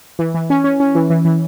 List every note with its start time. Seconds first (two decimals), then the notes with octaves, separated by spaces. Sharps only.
0.19 E3
0.34 E3
0.50 C#4
0.64 C#4
0.80 C#4
0.95 E3
1.10 E3
1.25 E3